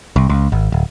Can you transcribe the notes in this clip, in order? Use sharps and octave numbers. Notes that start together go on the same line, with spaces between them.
C2
C#2
G#1
D1